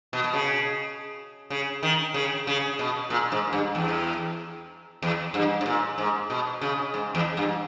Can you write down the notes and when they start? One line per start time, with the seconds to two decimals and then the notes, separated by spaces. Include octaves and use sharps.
0.13 B2
0.24 B2
0.34 C#3
1.50 C#3
1.83 D#3
2.14 C#3
2.47 C#3
2.79 B2
3.10 A#2
3.32 G#2
3.53 G2
3.75 E2
5.02 E2
5.34 G2
5.61 G#2
5.66 A#2
5.98 G#2
6.30 B2
6.61 C#3
6.94 G#2
7.15 E2
7.37 G2